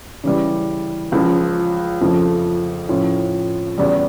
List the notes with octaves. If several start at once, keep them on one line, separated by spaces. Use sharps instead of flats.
C#3 E3 G3
C#2 C#3 F3
F2 C#3 F3 A3
A2 F3 C#4 F4
E2 C#3 G3